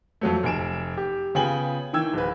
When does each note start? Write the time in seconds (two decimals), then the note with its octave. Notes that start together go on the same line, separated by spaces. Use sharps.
0.21 F2 F#3 A3
0.43 F1 G#5 D7 E7
0.97 G4
1.35 C#3 B3 F4 G5 G#5 F#7
1.93 D#3 E3 G5 E6 G#6
2.13 D1 B4